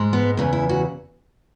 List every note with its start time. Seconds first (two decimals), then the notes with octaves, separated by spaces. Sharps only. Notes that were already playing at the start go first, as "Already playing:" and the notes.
Already playing: G#2 G#3
0.13 B3
0.37 E2 C#3 E3
0.53 E4
0.69 F#4